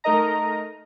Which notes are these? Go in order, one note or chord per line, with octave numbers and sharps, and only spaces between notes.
A3 D#4 A#4 D#5 A#5